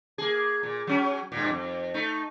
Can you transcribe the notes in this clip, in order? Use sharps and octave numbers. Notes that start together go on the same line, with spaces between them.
A#3 G#4
A#2
F#3 C#4
G2 A#2
F2
A3 D#4